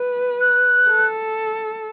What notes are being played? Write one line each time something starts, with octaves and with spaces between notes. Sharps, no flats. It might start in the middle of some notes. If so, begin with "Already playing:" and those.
Already playing: B4
F#6
A4